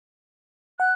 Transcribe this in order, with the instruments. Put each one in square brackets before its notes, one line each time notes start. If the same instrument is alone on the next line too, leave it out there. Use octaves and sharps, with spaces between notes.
[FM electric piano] F#5 [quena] F#6